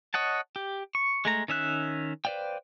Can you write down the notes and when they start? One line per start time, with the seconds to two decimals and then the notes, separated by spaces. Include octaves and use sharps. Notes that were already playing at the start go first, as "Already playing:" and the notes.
0.14 C#5 D#5 F#5 A5
0.56 G4
0.95 C#6
1.25 G#3 A3 A#5
1.48 D#3 C#4 E5 F#6
2.25 B4 C5 D5 F5 G5